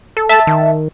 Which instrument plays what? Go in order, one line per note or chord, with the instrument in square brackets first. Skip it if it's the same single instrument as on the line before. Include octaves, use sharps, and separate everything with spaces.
[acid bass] A4
[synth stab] E5 A5
[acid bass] D#3